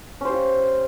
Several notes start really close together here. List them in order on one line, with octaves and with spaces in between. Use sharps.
C#4 C5 G4 F4